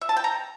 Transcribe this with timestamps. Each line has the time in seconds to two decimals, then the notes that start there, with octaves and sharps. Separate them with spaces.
0.01 E5
0.09 A5
0.17 G5
0.24 A#5